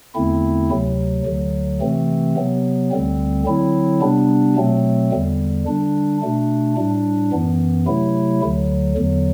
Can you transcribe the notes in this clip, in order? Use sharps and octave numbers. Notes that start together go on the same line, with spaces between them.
E2 D3 A3 C4 E4
D2 C3 F#3
D2 D3 F#3
C3 E3 A3 C4
C3 F#3 B3
D2 D3 G3 C4
D3 F#3 C4 E4
C3 G3 B3 D4
B2 F#3 A3 C4
E2 D3 G3
D3 G3 D4
B2 A3 D4
A2 G3 D4
F#2 E3 B3
C3 F#3 A3 E4
D2 D3 F#3
E2 D3 F#3